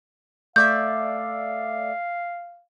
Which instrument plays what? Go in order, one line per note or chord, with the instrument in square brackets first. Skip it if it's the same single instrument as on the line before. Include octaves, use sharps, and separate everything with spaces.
[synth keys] A3 D5 E5 [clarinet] F5 [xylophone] G6